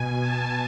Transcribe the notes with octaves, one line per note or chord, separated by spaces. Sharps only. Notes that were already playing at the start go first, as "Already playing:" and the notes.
Already playing: B2 G#5
A5